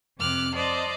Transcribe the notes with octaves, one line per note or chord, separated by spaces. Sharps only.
F2 C3 D6 F6 F#6
C5 D5 D#5 A5